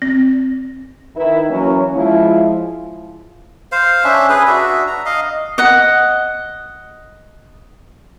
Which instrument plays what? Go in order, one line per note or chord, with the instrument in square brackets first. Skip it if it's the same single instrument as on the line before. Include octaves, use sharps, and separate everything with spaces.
[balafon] C4
[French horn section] D#3 D#4 E4 B4
E3 F#3 A#3 C#4
F3 G#3 E4
[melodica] C5 F5
C#4 D4 E5
G#4 B4
D4 F#4 E5
A#5
D#5 F5
[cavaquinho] D#5 F#5